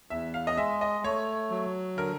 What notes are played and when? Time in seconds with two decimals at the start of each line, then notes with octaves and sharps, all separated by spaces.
0.10 E2 E5
0.34 F5
0.47 D#5
0.57 G#3 E5
0.81 D#5
1.04 A3 C#5
1.50 F#3
1.97 D3 A#4